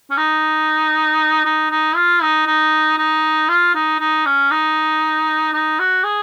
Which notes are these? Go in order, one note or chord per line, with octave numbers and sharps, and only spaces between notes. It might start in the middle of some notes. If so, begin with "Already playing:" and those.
C#4
D#4
D#4
D#4
F4
D#4
D#4
D#4
F4
D#4
D#4
C#4
D#4
D#4
F#4
G#4